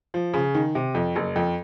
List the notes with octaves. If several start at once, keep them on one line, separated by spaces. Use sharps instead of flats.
F3
C#3
D#3
C3
F2
F#1
F2